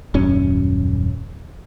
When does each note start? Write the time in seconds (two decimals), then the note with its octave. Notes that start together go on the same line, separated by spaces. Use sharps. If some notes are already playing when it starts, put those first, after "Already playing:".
0.14 D#1 F#2 C#4